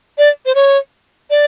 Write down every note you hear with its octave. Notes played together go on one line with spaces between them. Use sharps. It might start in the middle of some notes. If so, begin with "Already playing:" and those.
D5
C5
C#5
D5